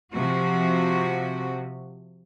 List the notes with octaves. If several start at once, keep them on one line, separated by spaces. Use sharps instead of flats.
C3 F3 F#4